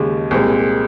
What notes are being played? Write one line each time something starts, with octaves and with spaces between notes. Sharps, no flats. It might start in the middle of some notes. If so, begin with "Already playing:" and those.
Already playing: D#2 C#3 G#3
C2 A#2 G#3 C4